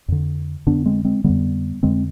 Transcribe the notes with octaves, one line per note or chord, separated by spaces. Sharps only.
F2 D3
F2 D3 B3 D4
G#3 C4
G#3 C4
F2 D3 G3 B3
F2 D3 G#3 C4